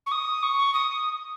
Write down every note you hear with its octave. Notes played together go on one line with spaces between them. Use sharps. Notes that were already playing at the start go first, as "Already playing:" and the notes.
C#6
D#6
C#6
D#6